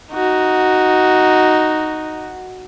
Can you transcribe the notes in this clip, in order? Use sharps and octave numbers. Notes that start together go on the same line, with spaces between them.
D#4 F#4